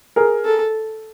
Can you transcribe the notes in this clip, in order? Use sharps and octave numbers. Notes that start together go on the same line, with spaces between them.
G#4 A#4
A4